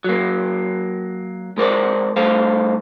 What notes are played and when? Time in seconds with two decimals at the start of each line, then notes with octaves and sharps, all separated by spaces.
0.04 F#3 A#3
1.58 G#3 A#4 C5 D5
2.16 G2 A3 C5 F5